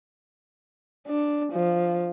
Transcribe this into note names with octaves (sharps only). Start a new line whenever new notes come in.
D4
F3